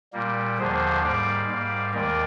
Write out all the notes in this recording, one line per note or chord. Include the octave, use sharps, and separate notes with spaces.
A#2 G3 A#3
D#2 D3 F3 G#4 C5
G#2 G3 A#3 D5 F5
G#2 G3 A#3
D#2 D#3 G#3 A#4 D5